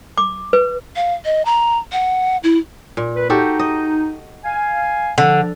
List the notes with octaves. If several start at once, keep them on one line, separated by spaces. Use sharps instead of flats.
D6
B4
F5
D#5
A#5
F#5
E4
A#2
B4
D#4 F#4 G4 A4
D#5
F5 G#5
D3 F3